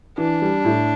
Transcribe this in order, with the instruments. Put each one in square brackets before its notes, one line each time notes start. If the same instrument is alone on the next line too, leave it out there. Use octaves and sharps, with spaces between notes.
[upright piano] E3 [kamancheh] D4
[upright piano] G3
A2